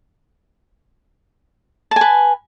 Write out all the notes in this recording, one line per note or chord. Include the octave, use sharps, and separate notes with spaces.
B4 G#5 A5